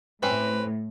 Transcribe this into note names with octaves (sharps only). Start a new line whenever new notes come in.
A2 C4 C#4 B4